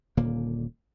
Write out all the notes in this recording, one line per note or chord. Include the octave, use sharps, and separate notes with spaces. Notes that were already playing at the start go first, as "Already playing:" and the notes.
D#1 A#2 D3 A#3